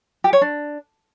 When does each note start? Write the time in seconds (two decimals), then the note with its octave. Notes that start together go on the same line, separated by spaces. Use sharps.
0.24 G4
0.33 C#5
0.42 D4